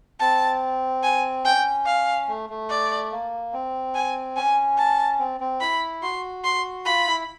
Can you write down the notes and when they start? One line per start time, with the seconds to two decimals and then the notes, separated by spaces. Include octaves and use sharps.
0.20 C4 A5
1.03 G#5
1.44 C#4 G5
1.86 F5
2.28 A3
2.50 A3
2.70 D5
3.11 A#3
3.53 C4
3.95 G#5
4.36 C#4 G#5
4.78 A5
5.19 C4
5.40 C4
5.60 E4 B5
6.02 F#4 C6
6.44 C6
6.86 F4 B5
7.06 E4